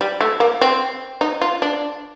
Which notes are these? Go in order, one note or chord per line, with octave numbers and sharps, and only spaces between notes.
G3
A3
A#3
C4
D#4
F4
D4